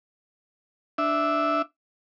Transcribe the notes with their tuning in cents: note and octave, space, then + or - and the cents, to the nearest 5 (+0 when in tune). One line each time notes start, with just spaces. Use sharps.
D4 +0 E5 -5